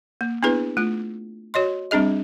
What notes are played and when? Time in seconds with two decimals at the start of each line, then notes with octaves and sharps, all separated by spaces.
0.21 A#3
0.43 B3 D4 E4 G#4 B4
0.77 A3 F4
1.54 F#4 C#5 D#5 C6
1.91 G3 C4 D4 G#4 D#5